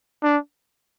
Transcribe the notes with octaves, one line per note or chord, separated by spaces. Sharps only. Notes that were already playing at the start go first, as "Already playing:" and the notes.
D4